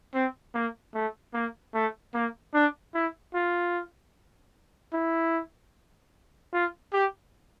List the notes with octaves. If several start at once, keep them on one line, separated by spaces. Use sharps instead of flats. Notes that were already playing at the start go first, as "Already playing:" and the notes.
C4
A#3
A3
A#3
A3
A#3
D4
E4
F4
E4
F4
G4